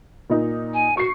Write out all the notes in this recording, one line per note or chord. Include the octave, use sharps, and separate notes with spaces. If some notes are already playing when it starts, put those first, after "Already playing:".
A#2 D#4
G#5
F#4 C#6 C7